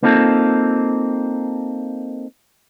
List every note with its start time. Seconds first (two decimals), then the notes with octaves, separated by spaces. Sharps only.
0.03 A#3 C4 D#4 F4 A4